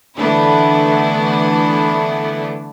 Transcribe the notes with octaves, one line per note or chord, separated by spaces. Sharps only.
D3 E3 A3 B3 D4 E4